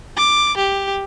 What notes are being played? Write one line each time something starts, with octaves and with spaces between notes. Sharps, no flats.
D6
G4